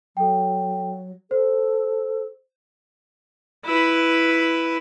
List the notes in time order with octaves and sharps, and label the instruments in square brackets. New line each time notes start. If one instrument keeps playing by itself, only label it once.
[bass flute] F#3 [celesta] A4 G5
[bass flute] A4 [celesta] C5
[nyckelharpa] E4 B4